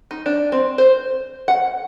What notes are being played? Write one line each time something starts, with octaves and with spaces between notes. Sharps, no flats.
D#4
D4
C4
C5
F#5